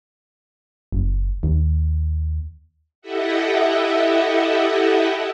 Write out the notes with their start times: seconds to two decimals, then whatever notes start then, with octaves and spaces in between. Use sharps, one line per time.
0.92 F#1
1.43 D#2
3.01 E4 G4 A4 D#5 E5 F#5